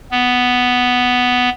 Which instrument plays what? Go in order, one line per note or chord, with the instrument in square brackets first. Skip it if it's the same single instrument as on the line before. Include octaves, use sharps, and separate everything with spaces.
[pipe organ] B3